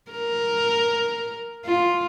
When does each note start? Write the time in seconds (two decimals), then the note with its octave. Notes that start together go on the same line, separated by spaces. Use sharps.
0.11 A#4
1.65 F4